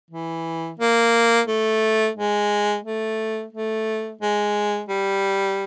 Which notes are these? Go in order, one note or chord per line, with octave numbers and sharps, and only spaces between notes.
E3
A#3
A3
G#3
A3
A3
G#3
G3